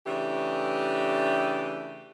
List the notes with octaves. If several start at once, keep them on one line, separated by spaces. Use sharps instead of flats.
C#3 E3 A3 D4 G4